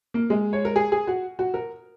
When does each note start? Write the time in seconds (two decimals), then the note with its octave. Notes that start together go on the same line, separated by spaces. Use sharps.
0.14 A#3
0.30 G#3
0.53 C#5
0.65 A#4
0.76 G#4
0.92 G#4
1.07 F#4
1.39 F#4
1.54 A#4